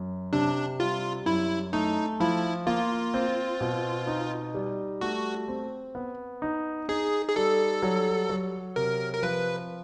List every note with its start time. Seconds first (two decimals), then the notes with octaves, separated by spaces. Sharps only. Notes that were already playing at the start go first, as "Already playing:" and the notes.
Already playing: F#2
0.33 C3 D4
0.79 G3 F4
1.26 F#2 E4
1.73 A3 D#4
2.20 F3 E4
2.66 A#3 F4
3.14 C4
3.61 B2
4.07 D#4
4.54 G3
5.01 A3 F#4
5.48 C4
5.95 B3
6.42 D#4
6.89 D#4 G#4
7.29 G#4
7.36 G3 A4
7.83 F#3
8.29 F#3
8.76 C3 A#4
9.14 A#4
9.23 F3 B4